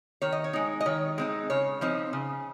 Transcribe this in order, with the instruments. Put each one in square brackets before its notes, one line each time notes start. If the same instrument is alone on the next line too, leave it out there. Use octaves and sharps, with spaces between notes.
[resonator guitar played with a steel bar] D#3 C#5
D#5
C#5
G#3 D#4
D#5
D#3 C#5
G#3 C4 D#4
C#3 C#5
F3 C4 D#4
C#3